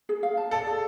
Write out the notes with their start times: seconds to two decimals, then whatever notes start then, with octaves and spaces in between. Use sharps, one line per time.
0.09 G#4
0.23 F5
0.37 A5
0.51 A4 D5
0.67 G#4